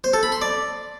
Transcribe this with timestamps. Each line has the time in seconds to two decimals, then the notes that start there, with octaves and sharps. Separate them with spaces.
0.04 C5
0.13 A4
0.23 B5
0.32 C6
0.42 D5